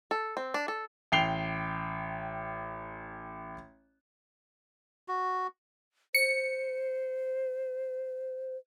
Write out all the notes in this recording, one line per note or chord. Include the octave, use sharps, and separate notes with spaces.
A4
C4
D4
A4
A1 G5 C7 F7 G7
F#4
C5 C#7